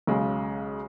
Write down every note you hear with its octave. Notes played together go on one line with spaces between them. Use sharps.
B1 C#3 G#3